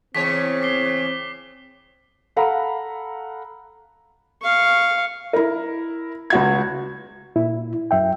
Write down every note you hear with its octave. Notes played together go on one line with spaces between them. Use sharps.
E2 C#3 C4 C#5 B6
D6 C7 G7
A4 F5 F#5 A#5 B5
F5 C#6
E4 A#4
C#2 F#4 G#6
A#2 E4
F#2 E5 G5